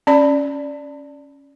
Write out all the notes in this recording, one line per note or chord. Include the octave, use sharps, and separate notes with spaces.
C#4 D5 B5